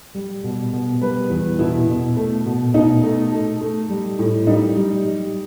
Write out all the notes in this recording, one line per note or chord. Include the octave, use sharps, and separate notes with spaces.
G3
B2
B2
G3 B4
E2
B2 E4
B2
A3
B2
B2 D#4
A3
A3
A3
G3
A2
G3 D#4
G3
G3